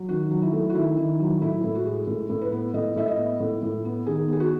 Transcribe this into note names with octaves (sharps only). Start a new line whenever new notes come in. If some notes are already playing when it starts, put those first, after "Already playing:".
Already playing: F#3
D#3 F#4
F#3
E4
A3
F#4
D#3 E4
D#3
F#3
A2 E4
A2
F#4
G#3
A2
A2
B4
B3
A2 D#5
A2 E5
D#5
B3
A2
A2
B3
D#3 G#4
B3 G#4
F#4